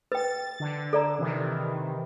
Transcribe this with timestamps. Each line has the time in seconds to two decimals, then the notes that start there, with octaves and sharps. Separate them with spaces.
0.12 B4 G5 A6
0.60 D3
0.93 A4 D5 A#5
1.19 C3 D#3 E3